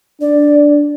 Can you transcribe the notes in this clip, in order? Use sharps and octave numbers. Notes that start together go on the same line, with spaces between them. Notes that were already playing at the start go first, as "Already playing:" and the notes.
D4 D5